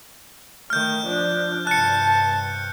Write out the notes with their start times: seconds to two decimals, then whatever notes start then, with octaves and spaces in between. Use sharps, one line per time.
0.70 D#3 A3 F6 G6
1.05 F3 D4
1.67 G2 C3 A5 F#6 C#7